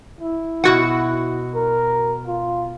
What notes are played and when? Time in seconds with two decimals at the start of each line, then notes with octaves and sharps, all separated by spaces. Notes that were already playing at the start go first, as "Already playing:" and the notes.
0.20 E4
0.64 B2 F#4 F#5
1.55 A#4
2.26 F4